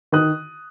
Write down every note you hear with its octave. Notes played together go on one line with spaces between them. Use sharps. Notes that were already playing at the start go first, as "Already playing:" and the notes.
D#3 D#6 F#6